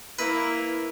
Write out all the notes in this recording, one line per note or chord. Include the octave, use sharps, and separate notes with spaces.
A#3 E4 B4